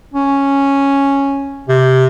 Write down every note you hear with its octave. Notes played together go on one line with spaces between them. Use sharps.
C#4
C3